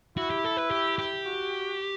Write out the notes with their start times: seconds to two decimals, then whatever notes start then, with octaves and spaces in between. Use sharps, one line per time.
0.17 E4 F#4
0.30 G4
0.44 A4
0.57 B4
0.71 G4
0.98 G4
1.25 F#4